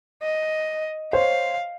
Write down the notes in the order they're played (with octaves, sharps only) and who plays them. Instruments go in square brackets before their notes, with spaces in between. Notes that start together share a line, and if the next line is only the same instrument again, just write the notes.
[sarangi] D#5
[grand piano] C5 C#5 [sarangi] F5